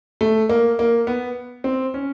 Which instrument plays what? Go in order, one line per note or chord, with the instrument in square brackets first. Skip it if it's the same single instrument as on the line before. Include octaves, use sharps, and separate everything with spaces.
[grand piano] A3
A#3
A#3
B3
C4
C#4